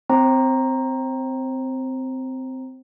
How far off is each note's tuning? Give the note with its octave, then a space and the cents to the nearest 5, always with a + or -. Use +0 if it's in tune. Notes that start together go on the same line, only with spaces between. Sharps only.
C4 -15 C5 +35 A#5 +0